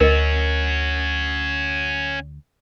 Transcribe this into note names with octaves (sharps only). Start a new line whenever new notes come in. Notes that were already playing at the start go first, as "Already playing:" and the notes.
D2 C#4 F#4 A#4 D#5